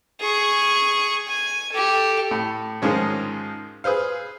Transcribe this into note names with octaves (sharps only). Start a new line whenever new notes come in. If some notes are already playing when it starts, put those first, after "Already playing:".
G#4 C#6
G#5
G4 A4
A2
G#2 D#3 F3 G#3 C#4
G#4 B4 C5 F5